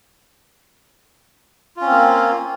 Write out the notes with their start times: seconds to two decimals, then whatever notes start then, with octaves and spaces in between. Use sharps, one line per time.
1.77 F4
1.81 C#4
1.86 C4
1.91 A#3